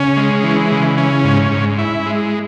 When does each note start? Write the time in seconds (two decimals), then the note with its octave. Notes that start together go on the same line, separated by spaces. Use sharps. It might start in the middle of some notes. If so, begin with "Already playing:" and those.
Already playing: C#3 C#4
0.17 G#3
0.43 E3
0.71 C#3
0.98 C#4
1.24 G#2
1.51 G#2
1.78 E4
2.06 G#3